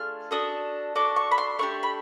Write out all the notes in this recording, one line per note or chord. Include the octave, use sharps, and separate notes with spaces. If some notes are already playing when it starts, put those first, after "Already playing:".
Already playing: A3 D4 F4 G#4 F6
D4 F#4 A4 D#6
D4 F#4 A4 D6
C#6
B5
C6
A3 D4 G4 C#6
B5